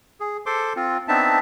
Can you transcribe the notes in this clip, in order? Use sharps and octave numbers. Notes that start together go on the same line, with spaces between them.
G#4
A4 C5 C6 D6
C4 F4
B3 C4 D4 D#4 E5 A5